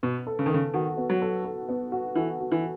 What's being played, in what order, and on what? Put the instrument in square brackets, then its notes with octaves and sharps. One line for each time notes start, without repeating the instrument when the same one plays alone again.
[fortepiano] B2 [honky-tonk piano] B3
[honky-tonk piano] A4
[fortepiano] C#3
D#3
[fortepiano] C#3 [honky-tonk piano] A4
[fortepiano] D#3 [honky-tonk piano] F#4
[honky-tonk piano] B3
[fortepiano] F#3
[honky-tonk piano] A4
A4
B3
F#4
[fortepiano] E3 [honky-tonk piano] A4
[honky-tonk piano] F#4
[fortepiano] E3